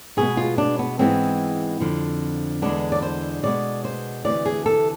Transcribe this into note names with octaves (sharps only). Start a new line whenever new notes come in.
B2 G#3 B3 G#4
F4
D4
B3
G#2 E3 G#3 B3 C4
F2 D3 F3
E2 D3 G#3 B3 D4
D5
C5
B2 G#3 B3 D5
C5
D2 C3 E3 D5
G#4
A4